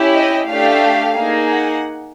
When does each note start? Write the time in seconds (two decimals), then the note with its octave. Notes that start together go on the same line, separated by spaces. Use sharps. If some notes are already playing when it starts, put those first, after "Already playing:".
Already playing: C#4 E4 G4
0.14 D#5
0.48 A3 D4 G4 F5
1.16 A#3 D#4 G#4
1.50 F#5